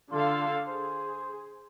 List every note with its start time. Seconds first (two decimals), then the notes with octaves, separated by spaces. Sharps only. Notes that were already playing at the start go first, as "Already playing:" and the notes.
0.12 D3 F4 A4 F5
0.68 G#4 C5